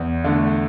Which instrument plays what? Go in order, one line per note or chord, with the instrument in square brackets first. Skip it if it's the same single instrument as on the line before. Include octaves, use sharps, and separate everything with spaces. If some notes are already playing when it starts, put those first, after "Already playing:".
Already playing: [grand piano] E2
D3 A3